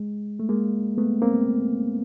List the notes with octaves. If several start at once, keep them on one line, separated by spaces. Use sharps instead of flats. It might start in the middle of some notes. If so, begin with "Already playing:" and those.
Already playing: G#3
A3
G#3 A#3
A3 B3
A#3 C4